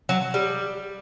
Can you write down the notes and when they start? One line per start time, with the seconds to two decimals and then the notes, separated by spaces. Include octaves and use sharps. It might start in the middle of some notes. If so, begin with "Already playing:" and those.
0.09 F#3
0.34 G3